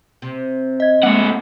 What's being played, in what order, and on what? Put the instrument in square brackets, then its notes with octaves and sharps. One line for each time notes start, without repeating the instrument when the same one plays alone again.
[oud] C3
[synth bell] D#5 G#6
[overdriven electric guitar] A2 F#5 [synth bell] G#3 A#3 C4